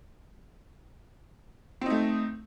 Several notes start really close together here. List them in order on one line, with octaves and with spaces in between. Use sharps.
C4 D#4 A3